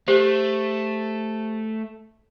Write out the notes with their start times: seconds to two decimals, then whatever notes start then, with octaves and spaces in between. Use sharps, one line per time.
0.08 A3 G4 C5